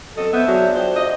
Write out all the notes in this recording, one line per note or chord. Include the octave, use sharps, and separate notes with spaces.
F#3 C4 A4 D#5
A3 B3 C5 E5
F#3 D4 F#4 G#4
F4 G4 C5
F4 D#5